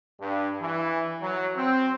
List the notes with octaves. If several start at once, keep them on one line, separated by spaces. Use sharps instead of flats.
G2
E3
F#3
C4